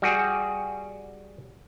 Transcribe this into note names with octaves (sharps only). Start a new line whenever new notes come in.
G3 F#4 G#4